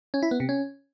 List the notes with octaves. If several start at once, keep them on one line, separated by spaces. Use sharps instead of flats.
C#4
E4
B3
C3
C#4